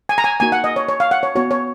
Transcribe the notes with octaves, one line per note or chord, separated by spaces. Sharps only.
G#5
A#5
G#5
A#3 D#4 F#4 G#5
F#5
D#5
C#5
C#5
F5
F#5
C#5
B3 F#4 C#5
C#5